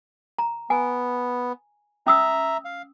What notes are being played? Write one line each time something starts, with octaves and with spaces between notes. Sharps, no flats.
A#5
B3 G#5
C#4 E5 A#5 D#6 E6
F5